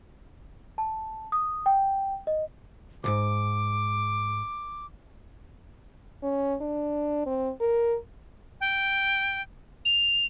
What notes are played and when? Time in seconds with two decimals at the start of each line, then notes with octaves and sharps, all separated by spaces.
0.78 A5
1.32 D#6
1.66 G5
2.27 D#5
3.04 C2 G#2 D6
6.23 C#4
6.61 D4
7.26 C4
7.61 A#4
8.61 G5
9.85 F7